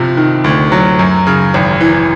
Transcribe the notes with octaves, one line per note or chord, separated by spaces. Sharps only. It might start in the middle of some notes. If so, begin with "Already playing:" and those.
Already playing: G1 C3 F3
D#3
D2
F#3
F#2
C#3
G#1
E3